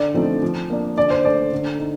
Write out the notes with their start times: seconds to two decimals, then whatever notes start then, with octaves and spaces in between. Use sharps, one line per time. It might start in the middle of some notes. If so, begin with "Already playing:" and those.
Already playing: D3 D5
0.14 F3 A3 C4 D#4
0.42 F3
0.70 A#3 D4
0.97 D3 D5
1.10 C5
1.25 A3 D4 D5
1.53 D3
1.79 D#4